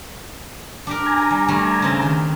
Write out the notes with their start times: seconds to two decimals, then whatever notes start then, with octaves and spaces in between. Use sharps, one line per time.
0.87 D4 G4 A#4
1.06 G#5 A#5
1.30 G3
1.48 G3 A3 D4
1.82 C#3 C4
2.02 D#3